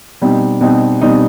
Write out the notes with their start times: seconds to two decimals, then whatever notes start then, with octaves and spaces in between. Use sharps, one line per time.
0.21 B2 G3 C4 D#4
0.61 B2 G3 C4 D#4
1.01 B2 G3 C4 D#4